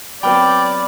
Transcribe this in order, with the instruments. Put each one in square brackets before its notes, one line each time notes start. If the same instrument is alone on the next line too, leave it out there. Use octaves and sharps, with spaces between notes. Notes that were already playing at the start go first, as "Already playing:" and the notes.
[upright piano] F#3 B3 C4 [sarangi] D5 [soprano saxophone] G5 [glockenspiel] B5 D6 F6